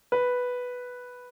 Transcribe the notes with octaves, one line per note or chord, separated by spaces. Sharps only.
B4